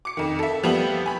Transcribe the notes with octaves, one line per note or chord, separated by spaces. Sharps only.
D6 C#7
F2 D#3
A4 E5
F3 G3 B3 G4 E5 F#7
G#5 B5